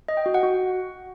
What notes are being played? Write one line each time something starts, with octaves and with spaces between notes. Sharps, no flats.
D#5
G5
F#4
F#5
F#4